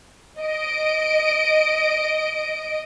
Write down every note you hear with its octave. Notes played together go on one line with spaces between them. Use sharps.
D#5 D7